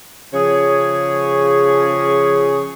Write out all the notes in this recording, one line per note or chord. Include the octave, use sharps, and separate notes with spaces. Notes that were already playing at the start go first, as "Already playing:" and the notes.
C#3 F3 G#4 C#5